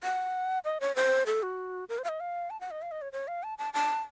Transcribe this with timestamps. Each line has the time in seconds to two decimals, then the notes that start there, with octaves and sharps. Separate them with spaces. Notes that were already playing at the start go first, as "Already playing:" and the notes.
0.03 F#5
0.65 D#5
0.81 C#5
0.96 C5
1.26 A4
1.43 F#4
1.89 A#4
1.99 C5
2.04 F5
2.09 D#5
2.20 F5
2.50 A5
2.61 F#5
2.71 D#5
2.82 F5
2.91 D#5
3.02 C#5
3.13 C#5
3.28 F5
3.43 A5
3.58 A5
3.74 A5